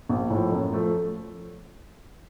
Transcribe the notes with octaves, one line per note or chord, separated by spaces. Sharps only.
A#1
A2 F3
F#2
F3 A3